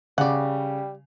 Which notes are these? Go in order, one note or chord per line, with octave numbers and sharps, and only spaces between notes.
C#3 G3 D5 F#5